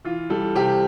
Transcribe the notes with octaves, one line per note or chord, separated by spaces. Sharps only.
E3 F4
G3 A4
C3 G4